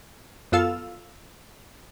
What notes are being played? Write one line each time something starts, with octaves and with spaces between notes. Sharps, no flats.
F#2 B3 F4 A4 F5 E6